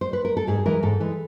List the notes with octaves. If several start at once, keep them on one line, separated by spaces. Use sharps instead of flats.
C5
B4
A#4
A4
G#2 G#4
E3 G#3 A#4
G#2 A4
E3 G#3